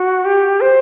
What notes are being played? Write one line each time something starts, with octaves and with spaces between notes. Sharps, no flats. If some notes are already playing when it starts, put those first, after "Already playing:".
Already playing: F#4
G4
C5